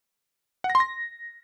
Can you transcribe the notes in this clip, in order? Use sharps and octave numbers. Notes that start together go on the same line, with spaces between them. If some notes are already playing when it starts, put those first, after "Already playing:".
F#5
A#6
C6
A#6